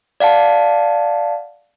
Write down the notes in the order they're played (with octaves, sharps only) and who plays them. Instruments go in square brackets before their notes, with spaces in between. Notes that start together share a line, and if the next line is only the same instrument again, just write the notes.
[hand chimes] D5 F5 F#5 A5